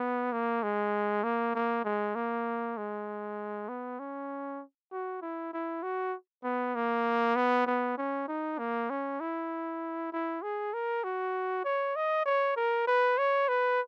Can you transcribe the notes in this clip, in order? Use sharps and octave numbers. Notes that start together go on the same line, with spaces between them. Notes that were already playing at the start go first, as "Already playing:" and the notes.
Already playing: B3
A#3
G#3
A#3
A#3
G#3
A#3
G#3
B3
C#4
F#4
E4
E4
F#4
B3
A#3
B3
B3
C#4
D#4
A#3
C#4
E4
E4
G#4
A#4
F#4
C#5
D#5
C#5
A#4
B4
C#5
B4